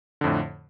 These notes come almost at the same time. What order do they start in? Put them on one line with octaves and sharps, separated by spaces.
D3 F2 A2